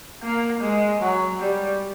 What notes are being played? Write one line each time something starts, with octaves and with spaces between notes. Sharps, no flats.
A#3
G#3
F#3
G3